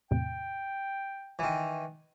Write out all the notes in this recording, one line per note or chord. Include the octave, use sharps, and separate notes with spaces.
E2 A2 C3 G5
D#3 E3